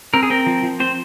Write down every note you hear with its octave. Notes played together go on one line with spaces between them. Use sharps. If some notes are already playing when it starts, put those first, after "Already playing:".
C4 A#4
G#4
C4 A#4
F3
F3
C4 C5